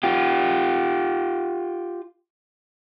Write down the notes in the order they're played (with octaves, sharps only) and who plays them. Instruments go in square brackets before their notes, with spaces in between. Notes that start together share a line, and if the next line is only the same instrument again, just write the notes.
[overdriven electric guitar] F4 G4